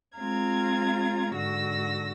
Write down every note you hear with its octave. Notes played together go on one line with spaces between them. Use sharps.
G#3 C4 F4 F5 A#5 G#6
G#2 D3 F#4 E6 A#6